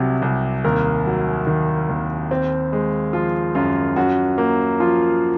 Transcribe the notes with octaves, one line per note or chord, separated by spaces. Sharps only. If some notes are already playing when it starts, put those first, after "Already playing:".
Already playing: C2 C3 F#3
C2
D#2 A#4
F#3
D#3
D#2
C4
G#3
F3 F4
F#2 F4
F#2 F#4
A#3
F3 F4